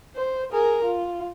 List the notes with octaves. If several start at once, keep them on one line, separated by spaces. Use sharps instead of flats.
C5
G#4 A#4
F4